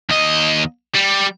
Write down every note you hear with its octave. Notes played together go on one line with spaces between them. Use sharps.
D#2 D#5
G3